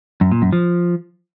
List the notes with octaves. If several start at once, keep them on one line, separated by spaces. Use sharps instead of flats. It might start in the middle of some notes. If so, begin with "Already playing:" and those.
F#2
A#2
F#2
F3